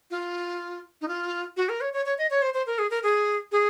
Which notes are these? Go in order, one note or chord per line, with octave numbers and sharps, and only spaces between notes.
F4
D#4
F4
F#4
A#4
C#5
C#5
C#5
D#5
C#5
C5
C5
A#4
G#4
A#4
G#4
G#4